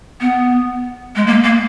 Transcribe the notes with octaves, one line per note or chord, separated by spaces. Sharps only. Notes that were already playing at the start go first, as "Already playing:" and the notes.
B3
G#3
A#3
A#3